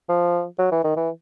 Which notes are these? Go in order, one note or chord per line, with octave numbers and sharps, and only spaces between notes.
F3
F#3
E3
D#3
E3